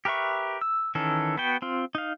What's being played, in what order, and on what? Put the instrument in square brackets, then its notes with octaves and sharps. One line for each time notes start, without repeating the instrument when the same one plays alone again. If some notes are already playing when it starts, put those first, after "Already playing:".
[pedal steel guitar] G4 A#4 B4 E5 C#6
E6
D#3 E3 C#4 A4
B3 F#4 G5
C4 F4
D#4 F5